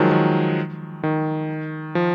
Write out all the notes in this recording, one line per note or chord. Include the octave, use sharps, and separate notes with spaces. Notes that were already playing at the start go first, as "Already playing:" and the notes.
Already playing: D#3 F3 F#3 G#3
D#3
D#3
F3